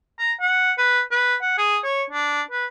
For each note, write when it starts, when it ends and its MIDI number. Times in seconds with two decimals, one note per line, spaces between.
0.19 0.32 82
0.41 0.72 78
0.78 1.02 71
1.11 1.35 71
1.42 1.54 78
1.58 1.79 68
1.84 2.03 73
2.10 2.42 62
2.51 2.66 71